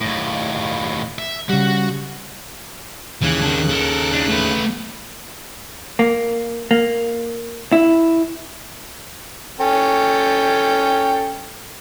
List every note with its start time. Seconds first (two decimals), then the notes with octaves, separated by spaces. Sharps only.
0.01 D#2 A2
1.18 E5
1.49 C#3 G3 F#4
3.22 D#2 C#3 E3 F#6
3.42 D#3 D4
3.70 A4 A#4
4.12 D4 D#4
4.29 A3 B4
5.99 A#3
6.71 A#3
7.72 E4
9.61 C#4 A4 G5